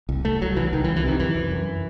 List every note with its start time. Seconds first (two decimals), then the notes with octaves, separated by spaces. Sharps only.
0.09 C2
0.25 C2 A3
0.41 C2 F#3
0.56 C2 E3
0.73 C2 D#3
0.84 E3
0.89 C2
0.96 E3
1.04 C3 D#3
1.20 F#2 E3
1.35 F#2
1.51 F#2